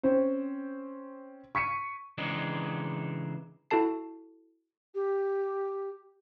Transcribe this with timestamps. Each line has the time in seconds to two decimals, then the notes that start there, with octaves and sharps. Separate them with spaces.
0.03 C4 C#4 C5
1.55 C#6 B6 C#7 D#7
2.18 C#3 E3 G#3 C4 D4 D#4
3.71 E4 F#4 A4 A5 C7
4.94 G4